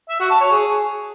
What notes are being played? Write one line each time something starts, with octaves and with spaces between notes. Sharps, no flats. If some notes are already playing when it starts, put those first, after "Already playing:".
E5
F#4
A5
C#5
G#4